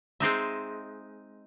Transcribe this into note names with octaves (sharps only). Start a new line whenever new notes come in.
G#3 C4 D#4 E5